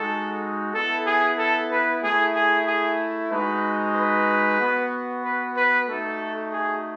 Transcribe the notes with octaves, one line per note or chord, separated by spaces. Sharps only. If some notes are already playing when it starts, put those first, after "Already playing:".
Already playing: G#3 D#4 F#4 A4
B3 E4 A4
G#4
A4
B4
A3 E4 G#4
G#4
G#4
G#3 D#4 F#4 B4
B4
B3 F#4
B4
B4
A3 D#4 F#4 A4
G#4